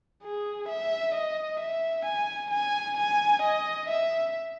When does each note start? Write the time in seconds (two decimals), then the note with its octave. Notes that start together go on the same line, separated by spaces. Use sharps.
0.23 G#4
0.69 E5
1.15 D#5
1.60 E5
2.05 G#5
2.51 G#5
2.97 G#5
3.42 D#5
3.89 E5